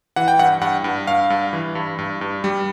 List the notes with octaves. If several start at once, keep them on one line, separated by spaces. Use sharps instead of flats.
E3 F#5
G5
G2 F#5
G2 F#5
G2
G2 F5
G2
E3
G2
G2
G2
G3